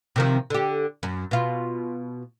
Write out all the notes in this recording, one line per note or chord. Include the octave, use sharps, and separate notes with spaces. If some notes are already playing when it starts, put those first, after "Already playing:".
C3 D#3 F3
D3 G4
F#2
B2 F4